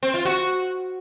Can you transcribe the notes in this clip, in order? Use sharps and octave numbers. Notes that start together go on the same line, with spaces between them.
C4
F4
F#4